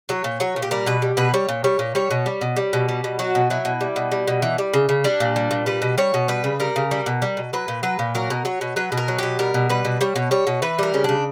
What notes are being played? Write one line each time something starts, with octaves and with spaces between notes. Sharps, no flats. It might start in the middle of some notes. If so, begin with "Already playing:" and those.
F#3 C#5
A#2
F#3 C#5
A#2
G4
G3 A#4
B2 B4
G3
B2 B4
G3 C#5
A#2
G3 C#5
A#2
G3 C#5
B2
G3
B2
G3
B2
G3
B2
F#3 F#4
B2
F#3 E4
B2
G3
B2
G3
B2
E3
G3
C#3
C#3
G3 D4
A#2
G3
A#2
G3 B4
B2
G3 C#5
B2
G3 B4
C#3
G3 A#4
C#3
G3
B2
G3
B2
F#3 B4
A#2
F#3 B4
A#2
F#3 A#4
B2
F#3 C#5
B2
F#3 B4
B2
A#4
F#3
B2 G4
G3 A#4
B2
G3 B4
B2
G3 C#5
B2
G3 C#5
B2
E3 B4
G3 A#4
C#3 C#4
C#3 D4